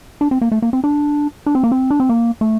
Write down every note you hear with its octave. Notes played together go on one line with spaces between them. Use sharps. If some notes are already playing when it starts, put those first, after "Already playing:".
D4
C4
A#3
A3
A#3
C4
D4
D4
C4
A#3
C4
D4
C4
A#3
A3